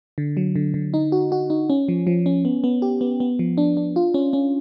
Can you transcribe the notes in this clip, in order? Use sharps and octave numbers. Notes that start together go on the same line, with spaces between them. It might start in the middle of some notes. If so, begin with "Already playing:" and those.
D3
F#3
D3
D3
D#4
F#4
F#4
D#4
C#4
F3
F3
C#4
B3
B3
G4
B3
B3
F3
D4
D4
F4
C#4
C#4